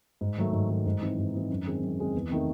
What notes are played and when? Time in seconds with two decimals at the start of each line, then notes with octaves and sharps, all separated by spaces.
0.21 G#2
0.37 D#3 F#3 A3
0.53 G#2
0.69 D#3 F#3 A3
0.86 G#2
1.01 E3 C4 D#4
1.18 G#2
1.34 E3 C4 D#4
1.50 F#2
1.66 D#3 G#3 C4
1.83 F#2
1.98 D#3 G#3 C4
2.14 E2
2.30 C3 D#3 A3 D#4